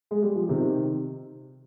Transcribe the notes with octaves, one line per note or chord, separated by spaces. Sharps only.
G#3
G3
F3
C3 D#3